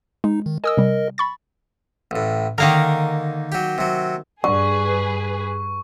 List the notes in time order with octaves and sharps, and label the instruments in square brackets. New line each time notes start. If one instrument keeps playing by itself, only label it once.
[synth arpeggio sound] G#3 [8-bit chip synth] D#4
[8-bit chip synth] D#3
[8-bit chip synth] A#4 D#5 [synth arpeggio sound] G#5 D#6 E6
[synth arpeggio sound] C3 G3
B5 C#6 A6
[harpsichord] A1 A2
[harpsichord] D3 D#4 [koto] D#3 A#3 A#4
[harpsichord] F#3 G4
C3 F#3
[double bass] G2 [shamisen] D3 [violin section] G#4 B4 [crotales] C#6